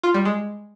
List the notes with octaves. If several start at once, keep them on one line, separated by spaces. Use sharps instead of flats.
F4
G3
G#3